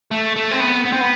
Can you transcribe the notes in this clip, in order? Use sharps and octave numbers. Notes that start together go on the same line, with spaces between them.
A3
A3
C4
B3
B3
C4
B3